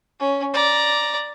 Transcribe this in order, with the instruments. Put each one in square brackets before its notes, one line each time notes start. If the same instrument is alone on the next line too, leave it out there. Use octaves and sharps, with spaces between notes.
[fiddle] C#4
D5 A#5